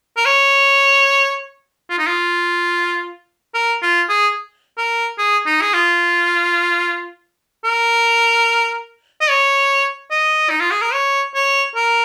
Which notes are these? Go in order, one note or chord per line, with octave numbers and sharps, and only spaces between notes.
A#4
C#5
F4
D#4
F4
A#4
F4
G#4
A#4
G#4
D#4
G#4
F4
A#4
D#5
C#5
D#5
D#4
F4
G#4
A#4
C#5
C#5
A#4